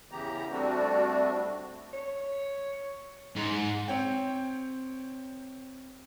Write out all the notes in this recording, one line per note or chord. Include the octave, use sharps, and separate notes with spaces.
E2 C#3 E3 B3 G4 A#5
G3 A3 C4 D4 F#4
C#5
G#2
C4 C#5 G5